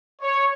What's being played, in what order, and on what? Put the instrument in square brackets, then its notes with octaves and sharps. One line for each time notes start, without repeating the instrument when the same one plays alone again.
[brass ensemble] C#5